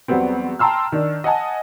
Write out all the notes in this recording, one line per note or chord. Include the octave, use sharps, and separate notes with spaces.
E2 F#3 G3 B3 C4
G5 A5 A#5 C6 E6 F6
D#3 D4
D#5 F#5 G#5 A5